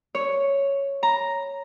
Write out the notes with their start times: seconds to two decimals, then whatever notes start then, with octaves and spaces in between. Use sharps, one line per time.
0.15 C#5
1.03 A#5